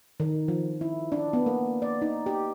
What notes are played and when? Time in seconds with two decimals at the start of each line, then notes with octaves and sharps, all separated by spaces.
0.20 D#3
0.48 F3
0.81 E4
1.12 D4
1.33 B3
1.46 A#3
1.82 D5
2.02 D#4
2.26 G4